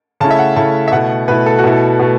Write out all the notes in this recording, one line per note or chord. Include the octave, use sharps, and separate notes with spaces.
C#3 A3 C#4 E4 A5
E5
F#5
C#3 A3 C#4 E4 A5
E5
B2 A3 E4 F#5
B2 A3 E4 B4
A4
F#4
B2 A3 E4
A4
B2 A3